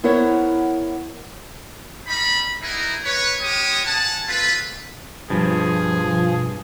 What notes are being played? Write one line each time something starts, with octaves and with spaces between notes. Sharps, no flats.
B3 E4 A#4 C5 C#5 F#5
G3 D#4 B5
B3 D#4 E4 G#4 A#4
B4 C#5
G#3 G4 C#5 D#6
F#5 G#5 A5
C4 F4 A4 B4
G2 B2 F3 G#4